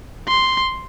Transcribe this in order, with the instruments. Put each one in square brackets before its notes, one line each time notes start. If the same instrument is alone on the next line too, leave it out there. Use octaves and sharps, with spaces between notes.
[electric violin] C6